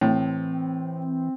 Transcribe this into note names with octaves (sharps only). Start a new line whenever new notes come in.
A2 E3 C4